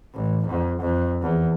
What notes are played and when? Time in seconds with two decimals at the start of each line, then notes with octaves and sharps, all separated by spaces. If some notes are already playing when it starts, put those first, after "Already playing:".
0.14 A1
0.47 F2
0.81 F2
1.22 E2